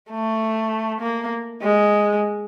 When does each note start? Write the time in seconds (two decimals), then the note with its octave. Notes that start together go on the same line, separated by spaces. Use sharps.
0.11 A3
1.01 A#3
1.61 G#3